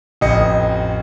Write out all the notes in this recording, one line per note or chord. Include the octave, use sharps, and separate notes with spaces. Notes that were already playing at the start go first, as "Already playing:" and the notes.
A1 F2 D#5 C#7